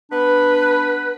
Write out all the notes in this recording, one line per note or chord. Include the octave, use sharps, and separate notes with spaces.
B3 D4 B4